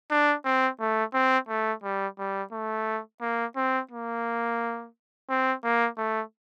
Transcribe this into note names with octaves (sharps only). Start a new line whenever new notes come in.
D4
C4
A3
C4
A3
G3
G3
A3
A#3
C4
A#3
C4
A#3
A3